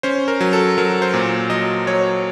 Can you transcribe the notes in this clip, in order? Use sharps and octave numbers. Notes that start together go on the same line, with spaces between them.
C#4 C5
A#4
F#3
A4
F#3 A#4
C5
A#2
F#3 D#5
F#3 C#5